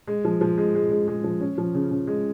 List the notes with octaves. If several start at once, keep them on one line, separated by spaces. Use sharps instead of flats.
G#3
F3
F3
G#3
G#3
G#3
G#3
F3
C#4
F3
C#3
C#3
G#3